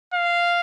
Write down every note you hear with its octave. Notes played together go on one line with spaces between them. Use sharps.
F5